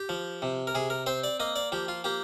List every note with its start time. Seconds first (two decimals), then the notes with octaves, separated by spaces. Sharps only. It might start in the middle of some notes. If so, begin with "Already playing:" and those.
Already playing: G4
0.09 F3
0.42 C3
0.67 A#4
0.75 C3 G#4
0.90 A#4
1.06 C4 C5
1.24 D5
1.40 A#3 D#5
1.56 D5
1.72 F3 G4
1.88 F4
2.04 A#3 G4